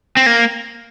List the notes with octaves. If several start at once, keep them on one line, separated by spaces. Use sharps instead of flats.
C4
A#3